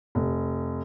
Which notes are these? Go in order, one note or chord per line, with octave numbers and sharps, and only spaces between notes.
F1